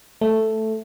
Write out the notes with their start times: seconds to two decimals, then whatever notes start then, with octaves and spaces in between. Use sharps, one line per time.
0.21 A3